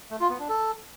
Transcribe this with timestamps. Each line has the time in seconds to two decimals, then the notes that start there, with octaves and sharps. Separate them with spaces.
0.10 A3
0.20 F4
0.30 B3
0.39 D4
0.49 A4